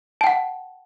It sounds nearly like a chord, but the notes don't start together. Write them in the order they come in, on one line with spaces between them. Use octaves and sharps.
A5 G5 F#5